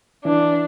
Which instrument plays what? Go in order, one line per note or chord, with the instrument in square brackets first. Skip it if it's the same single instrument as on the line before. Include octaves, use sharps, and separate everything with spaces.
[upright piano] E3 [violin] D4